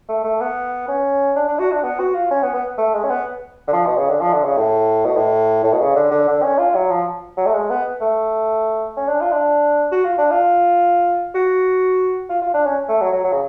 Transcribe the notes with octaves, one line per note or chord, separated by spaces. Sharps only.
A3
A3
B3
C#4
D4
D4
F#4
D4
B3
F#4
F4
C#4
B3
B3
A3
G#3
C#4
B3
D3
F3
B2
C#3
D3
F3
D3
C#3
A2
B2
A2
A2
B2
C#3
D3
D3
D3
C#4
F4
F#3
F3
F#3
A3
G#3
B3
A3
C#4
D4
F4
D4
F#4
F4
D4
F4
F#4
F4
F4
D4
C#4
A3
F#3
F#3
F#3
C#3